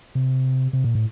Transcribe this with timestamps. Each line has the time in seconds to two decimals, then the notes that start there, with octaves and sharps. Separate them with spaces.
0.15 C3
0.73 C3
0.84 A#2
0.95 A2